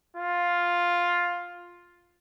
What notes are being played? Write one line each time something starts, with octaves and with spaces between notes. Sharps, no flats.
F4